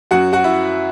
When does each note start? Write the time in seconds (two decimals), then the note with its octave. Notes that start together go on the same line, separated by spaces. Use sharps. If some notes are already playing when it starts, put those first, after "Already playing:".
0.11 F#2 F#3 F#4 F#5
0.33 F#4 F#5
0.44 E4 E5